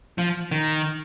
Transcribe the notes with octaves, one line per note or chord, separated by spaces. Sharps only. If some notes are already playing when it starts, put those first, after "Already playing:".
F3
D#3